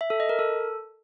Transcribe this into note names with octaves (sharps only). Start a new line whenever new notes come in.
E5
A4
D#5
A#4
A4